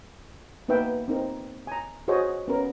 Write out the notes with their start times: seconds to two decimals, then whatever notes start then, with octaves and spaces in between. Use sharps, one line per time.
0.68 A#3 B3 D#4 B4 E5 G5
1.08 C4 D#4 A#4
1.67 G#5 A#5
2.08 F#4 G#4 C5 C#5 D#5
2.48 B3 C#4 A#4